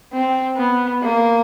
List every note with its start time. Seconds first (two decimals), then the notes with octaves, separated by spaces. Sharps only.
0.13 C4
0.57 B3
1.02 A#3